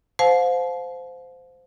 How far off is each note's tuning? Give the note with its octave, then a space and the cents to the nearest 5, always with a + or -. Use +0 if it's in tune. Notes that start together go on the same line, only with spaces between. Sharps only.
C5 -15 F5 +35 A5 -35